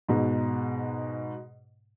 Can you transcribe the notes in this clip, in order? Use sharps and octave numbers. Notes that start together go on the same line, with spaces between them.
G#2 B2